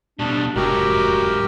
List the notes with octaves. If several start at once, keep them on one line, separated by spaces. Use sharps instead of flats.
B2 G3 D4
F1 G#2 F#3 F#4 G4 A#4